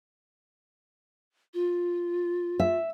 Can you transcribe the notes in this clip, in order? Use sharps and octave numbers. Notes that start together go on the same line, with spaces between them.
F4
E5